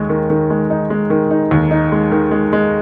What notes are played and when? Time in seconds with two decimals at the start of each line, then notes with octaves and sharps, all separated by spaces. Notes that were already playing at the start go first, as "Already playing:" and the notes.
Already playing: D#2 G#3
0.09 D#3
0.30 D#3
0.50 G#3
0.70 D#4
0.90 G#3
1.10 D#3
1.31 D#4
1.51 D#2
1.71 D#4
1.92 G#3
2.12 D#3
2.31 G#3
2.53 G#3